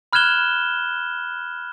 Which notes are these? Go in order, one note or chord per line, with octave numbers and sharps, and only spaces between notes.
B5 F6 F#6 G#6 E7 G7